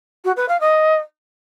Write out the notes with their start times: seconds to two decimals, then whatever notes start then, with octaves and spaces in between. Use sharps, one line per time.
0.25 F#4
0.37 B4
0.48 F5
0.60 D#5